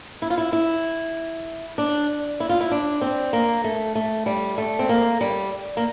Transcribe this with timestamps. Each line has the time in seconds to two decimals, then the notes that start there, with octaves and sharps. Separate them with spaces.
0.22 E4
0.30 F4
0.37 E4
0.53 E4
1.78 D4
2.40 E4
2.49 F4
2.61 E4
2.71 D4
3.01 C4
3.33 A#3
3.64 A3
3.95 A3
4.26 G3
4.58 A3
4.79 C4
4.89 A#3
5.21 G3
5.77 A#3